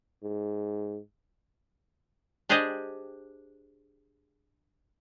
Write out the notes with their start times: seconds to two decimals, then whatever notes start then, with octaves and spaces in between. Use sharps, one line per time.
0.23 G#2
2.49 D4 G4 G#4 C5 D5 D#5